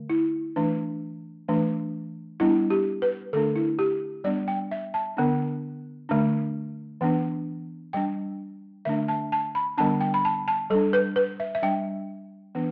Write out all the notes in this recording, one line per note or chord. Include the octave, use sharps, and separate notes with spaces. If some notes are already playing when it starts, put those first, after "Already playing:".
Already playing: D3 A3
E4
E3 A3 D4
E3 A3 D4
G3 B3 D4 E4
G4
B4
D3 A3 D4 A4
E4
G4
G3 B3 D4 D5
G5
E5
A5
D3 B3 D4
D3 A3 D4
E3 B3 D4
G3 D4 G5
D3 A3 D4 E5
A5
A5
B5
D3 G3 B3 D4 A5
G5
B5
A5
A5
G3 D4 A4
B4
B4
E5
E5
G3 D4 G5
E3 B3 D4